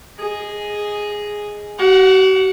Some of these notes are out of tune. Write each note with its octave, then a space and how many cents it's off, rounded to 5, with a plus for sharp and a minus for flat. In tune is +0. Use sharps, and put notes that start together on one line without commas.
G#4 +0 D#5 +0
F#4 +45 F#5 -15